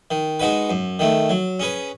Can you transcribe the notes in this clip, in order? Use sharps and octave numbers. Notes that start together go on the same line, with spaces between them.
D#3
G#3 D#4 F#4 B4
F#2
D#3 A3
F#3
C#4 G#4 B4